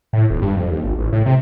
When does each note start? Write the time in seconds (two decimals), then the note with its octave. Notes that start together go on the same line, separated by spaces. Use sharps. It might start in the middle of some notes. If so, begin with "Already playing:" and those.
0.13 A2
0.30 D#1
0.42 G2
0.57 F2
0.71 D#2
0.84 G#1
0.98 A1
1.12 A2
1.26 C3